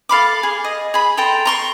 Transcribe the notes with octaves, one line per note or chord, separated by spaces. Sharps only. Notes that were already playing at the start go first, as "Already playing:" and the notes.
A4 F5 B5 D6
G#4
D#5
G#4 B5
A4 G5 A#5 C6
A#5 C6 C#6